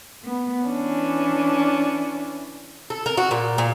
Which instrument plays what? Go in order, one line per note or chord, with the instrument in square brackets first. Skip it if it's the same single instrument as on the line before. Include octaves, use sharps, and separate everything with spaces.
[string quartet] B3
E3 C#4 D4
[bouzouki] A4
A#4
F#4
A#2
A#2